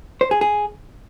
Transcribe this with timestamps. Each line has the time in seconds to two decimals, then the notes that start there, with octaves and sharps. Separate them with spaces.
0.21 C5
0.31 G#4
0.41 G#4